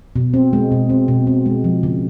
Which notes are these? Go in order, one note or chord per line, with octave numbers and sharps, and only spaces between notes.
B2
C4
G#3
B2
C4
B2
C4
G#3
F3
C#3